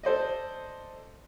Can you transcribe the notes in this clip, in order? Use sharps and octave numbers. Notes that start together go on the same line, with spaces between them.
A4 C5 D5 D#5